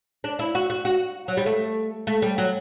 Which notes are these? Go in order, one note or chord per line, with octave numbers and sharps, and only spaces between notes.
D4
E4
F#4
F#4
F#4
F#3
G3
A3
A3
G3
F#3